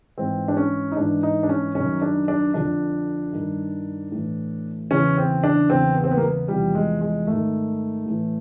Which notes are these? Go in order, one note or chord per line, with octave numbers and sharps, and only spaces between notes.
G#2 E3 C4
D4
C#4
D#4
G#2 E3 D4
D#4
D4
C#4
F#2 D#3 C#4
D4
D4
F2 D3 F3 D4
G2 D#3
A2 E3
E2 C#3 E3 C#4
C4
D4
E2 C#3 E3 C4
B3
C4
B3
A#3
B3
E2 C3 F3 G3
G#3
G#3
G#2 D#3 A3
A2 E3